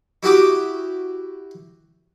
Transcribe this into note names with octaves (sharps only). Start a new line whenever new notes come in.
E4 F#4 G4 D6 D#6